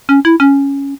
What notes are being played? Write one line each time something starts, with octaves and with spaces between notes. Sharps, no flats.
C#4
E4
C#4